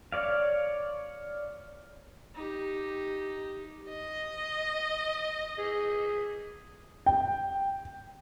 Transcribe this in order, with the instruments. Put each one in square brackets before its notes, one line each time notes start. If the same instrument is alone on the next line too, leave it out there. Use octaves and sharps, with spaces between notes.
[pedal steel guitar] C#5 D5 F5
[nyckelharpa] D#4 G4
[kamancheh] D#5
[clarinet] G#4
[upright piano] G5